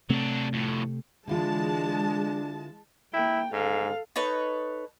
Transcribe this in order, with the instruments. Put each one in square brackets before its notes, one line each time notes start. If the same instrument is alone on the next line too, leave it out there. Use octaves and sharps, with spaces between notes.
[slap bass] C3 A3 C4 [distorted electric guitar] F#3 D4
[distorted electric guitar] F2 A2
[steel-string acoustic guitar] D3 E3 F4 [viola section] G#3 A5 [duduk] D4
[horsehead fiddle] A#3 G5 [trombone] E4
[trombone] G#2 [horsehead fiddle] A4 F5
[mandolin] D#4 A4 B4 C#5